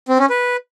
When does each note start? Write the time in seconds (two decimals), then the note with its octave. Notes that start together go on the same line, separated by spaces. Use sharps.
0.08 C4
0.19 C#4
0.30 B4